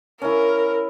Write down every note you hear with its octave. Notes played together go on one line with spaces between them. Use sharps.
C#4 E4 A#4